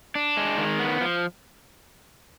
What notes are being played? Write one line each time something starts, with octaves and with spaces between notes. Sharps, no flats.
D4
G#3
D#3
B3
F3